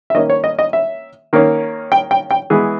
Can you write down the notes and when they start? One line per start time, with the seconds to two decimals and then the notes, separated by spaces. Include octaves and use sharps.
0.10 E5
0.14 D#3 A#3 C#4 D#5
0.30 C#5
0.44 D#5
0.59 D#5
0.73 E5
1.33 D#3 A#3 C#4
1.92 G5
2.11 G5
2.31 G5
2.50 E3 G#3 B3 G#4